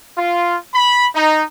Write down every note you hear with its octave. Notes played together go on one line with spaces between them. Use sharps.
F4
B5
D#4